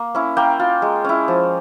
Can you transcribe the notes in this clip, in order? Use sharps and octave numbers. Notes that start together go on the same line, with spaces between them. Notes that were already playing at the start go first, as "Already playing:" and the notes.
Already playing: A#3
C#4 E4
A#3 G5
F4
G#3
C#4 E4
F3